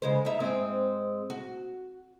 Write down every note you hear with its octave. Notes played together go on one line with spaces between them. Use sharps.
C#3 G#3 C5
D#4 E5
G#2 G#3 C4
F#4